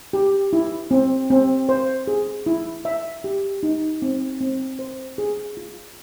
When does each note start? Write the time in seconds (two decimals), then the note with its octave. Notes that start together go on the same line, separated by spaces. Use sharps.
0.13 G4
0.53 E4
0.91 C4
1.30 C4
1.69 C5
2.08 G#4
2.46 E4
2.85 E5
3.24 G4
3.63 D#4
4.02 C4
4.40 C4
4.79 C5
5.18 G#4
5.57 F4